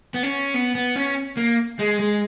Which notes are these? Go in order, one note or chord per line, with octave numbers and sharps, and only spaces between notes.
B3
C#4
B3
B3
C#4
A#3
G#3
G#3